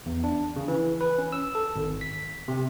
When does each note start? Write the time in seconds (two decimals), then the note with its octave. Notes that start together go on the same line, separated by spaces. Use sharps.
0.06 E2
0.24 D4
0.56 C#3
0.68 E3
1.01 B4
1.18 C#4
1.32 E6
1.55 A4
1.76 G#1
2.01 B6
2.48 C3